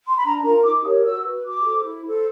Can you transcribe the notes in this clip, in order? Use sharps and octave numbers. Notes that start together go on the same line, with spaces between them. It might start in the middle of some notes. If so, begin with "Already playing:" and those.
C6
B5
D4 A#5
F4 A#4 A#5
D#4 D6
G4 A#4 C#5 D#6
F#4 E6
B4
F#4 D6
A4 C5
E4
A4 C5